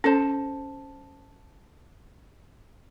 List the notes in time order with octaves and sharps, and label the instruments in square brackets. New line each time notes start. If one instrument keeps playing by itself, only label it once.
[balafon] C#4 [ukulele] A4 C5